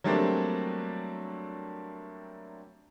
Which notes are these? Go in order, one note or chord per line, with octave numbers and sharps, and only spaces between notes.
F#3 G3 A3 A#3 C4 D4